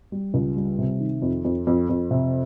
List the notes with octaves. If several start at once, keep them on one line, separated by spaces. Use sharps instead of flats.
G3
C#2
G3
C3
D#3
F2
F2
F2
F2
C3